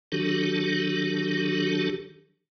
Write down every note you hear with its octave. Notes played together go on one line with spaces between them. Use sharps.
D#3 F#3 D4 F#4 G4 A4